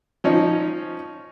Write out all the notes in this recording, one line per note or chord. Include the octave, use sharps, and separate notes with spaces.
F3 C#4 D#4